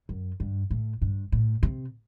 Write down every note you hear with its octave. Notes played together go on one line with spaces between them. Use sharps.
F#2
G2
A2
G2
A2
C3